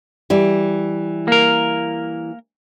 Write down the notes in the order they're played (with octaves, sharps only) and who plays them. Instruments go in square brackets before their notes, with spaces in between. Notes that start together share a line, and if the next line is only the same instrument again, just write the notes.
[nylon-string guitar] E3 G3
[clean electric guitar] A#3 A#4